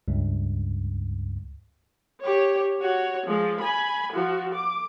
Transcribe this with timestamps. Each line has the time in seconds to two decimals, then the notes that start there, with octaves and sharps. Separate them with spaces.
0.08 C#2 G2
2.21 G4 C#5
2.79 F#4 C#5
3.27 F3 G#3
3.61 G#5 B5
4.12 F3 F#4
4.54 D6